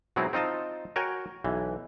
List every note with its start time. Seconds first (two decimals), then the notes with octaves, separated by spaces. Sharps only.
0.16 B2 F#3 G#3 C4 D#4 E4
0.33 C4 D#4 F4 D#5 A5
0.96 F#4 A#4 C#5 G5 G#5
1.44 B1 E3